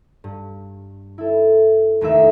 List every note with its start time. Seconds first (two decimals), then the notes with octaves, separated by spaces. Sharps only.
0.24 G2
1.18 E4 A4
2.01 F1 D#2 A3 E5